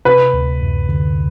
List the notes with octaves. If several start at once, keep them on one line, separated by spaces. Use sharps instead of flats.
C3 B4
D2
F#2
D3